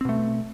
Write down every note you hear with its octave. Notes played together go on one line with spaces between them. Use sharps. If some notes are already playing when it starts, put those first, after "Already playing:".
B2 A3 C4